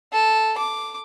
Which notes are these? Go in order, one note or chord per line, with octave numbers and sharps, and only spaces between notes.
A4
D6